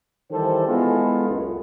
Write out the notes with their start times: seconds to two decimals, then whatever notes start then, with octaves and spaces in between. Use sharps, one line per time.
0.31 D#3 E3 G3 G4 A4 C5
0.67 G#3 B3 E4 F4 G#4 A4
1.27 C#2 F#2